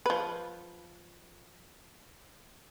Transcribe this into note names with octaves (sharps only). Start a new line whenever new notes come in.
F3 B4